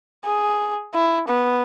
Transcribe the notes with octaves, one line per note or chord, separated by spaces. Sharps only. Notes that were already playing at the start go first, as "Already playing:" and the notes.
G#4
E4
B3